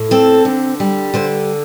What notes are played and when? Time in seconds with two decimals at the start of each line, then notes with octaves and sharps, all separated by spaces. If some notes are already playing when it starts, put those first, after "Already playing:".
Already playing: A2
0.11 C4 A4
0.45 D3
0.80 G3
1.14 D3 C5